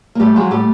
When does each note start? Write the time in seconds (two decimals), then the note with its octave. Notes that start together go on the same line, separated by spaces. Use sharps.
0.15 A#3
0.20 A2 G3 A3
0.36 F3 F#3 G#3
0.51 A2 G3 A3